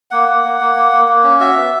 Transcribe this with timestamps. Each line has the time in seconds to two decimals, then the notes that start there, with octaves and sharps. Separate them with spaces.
0.11 A#3 F#5
0.28 A#3
0.44 A#3
0.60 A#3
0.75 A#3
0.92 A#3
1.08 A#3
1.24 C#4
1.40 F#4 E5
1.57 B3